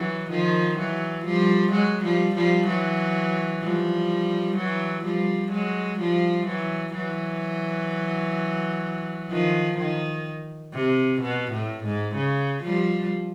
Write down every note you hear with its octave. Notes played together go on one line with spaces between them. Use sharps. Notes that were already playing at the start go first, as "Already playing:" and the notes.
Already playing: E3 F#3
D#3 F3
E3 F#3
F3 G3
F#3 G#3
F3 G3
F3 G3
E3 F#3
F3 G3
E3 F#3
F3 G3
F#3 G#3
F3 G3
E3 F#3
E3 F#3
D#3 F3
D#3
C3
B2
A2
G#2
C#3
F3 G3